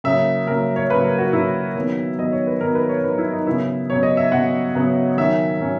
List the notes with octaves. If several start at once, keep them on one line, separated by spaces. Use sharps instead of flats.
C#3 F#3 A#3 E5
C#3 F#3 A#3 A#4
C#5
C#3 F#3 A#3 B4
A#4
F#4
C#3 F#3 A#3 E4
D#3 F#3 B3
D#3 F#3 B3 D#5
C#5
B4
D#3 F#3 B3 A#4
B4
C#5
D#3 F#3 B3 B4
E4
D#4
C#3 F#3 B3 E4
C#3 F#3 B3 C#5
D#5
E5
C#3 F#3 B3 F#5
C#3 F#3 B3
D#3 F#3 C#4 E5
D#3 F#3 C#4